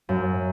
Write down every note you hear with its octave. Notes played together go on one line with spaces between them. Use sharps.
F#2